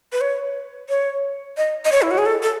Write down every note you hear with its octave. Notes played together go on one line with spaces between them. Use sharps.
B4
C#5
C#5
D#5
D#5
C#5
E4
F#4
G#4
A4
A4